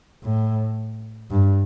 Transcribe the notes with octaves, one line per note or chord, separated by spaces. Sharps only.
A2
G2